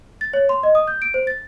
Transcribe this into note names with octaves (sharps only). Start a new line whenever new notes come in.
A6
C#5
C6
D#5
D#6
G6
D7
C5
A6